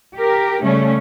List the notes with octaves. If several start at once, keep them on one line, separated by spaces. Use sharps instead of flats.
G4 A#4
C#3 G3 A3 C#4